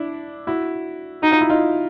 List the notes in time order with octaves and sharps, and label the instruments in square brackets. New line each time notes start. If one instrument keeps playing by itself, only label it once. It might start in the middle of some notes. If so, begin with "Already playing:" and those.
Already playing: [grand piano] D4 E4
E4 F#4
[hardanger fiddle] D#4 [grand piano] F#4
[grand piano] F4
E4
D#4 F4